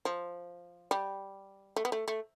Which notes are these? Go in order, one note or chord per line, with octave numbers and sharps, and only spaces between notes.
F3
G3
A3
B3
A3
A3